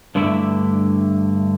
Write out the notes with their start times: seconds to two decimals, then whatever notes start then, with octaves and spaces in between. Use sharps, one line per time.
0.15 G2 D3 A3 E4 D5 E5